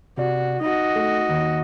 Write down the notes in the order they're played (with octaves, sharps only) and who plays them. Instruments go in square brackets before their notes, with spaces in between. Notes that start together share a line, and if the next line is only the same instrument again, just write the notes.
[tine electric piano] C3 D5 [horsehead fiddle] F#4
[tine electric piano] D#4 [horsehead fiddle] F#4 D#5
[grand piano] A3
D#2